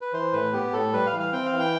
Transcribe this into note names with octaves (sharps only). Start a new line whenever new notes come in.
B4
E3 C5
A2 B4
B3 G4
A2 A4
G3 B4
F5
E3
F5
C4 G5
F5
E3
G5